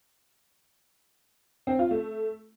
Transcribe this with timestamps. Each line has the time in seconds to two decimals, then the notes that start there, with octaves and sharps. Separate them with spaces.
1.67 C4
1.79 F4
1.91 A3